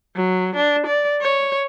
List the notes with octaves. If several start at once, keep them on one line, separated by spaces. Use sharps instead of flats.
F#3
D4
D5
C#5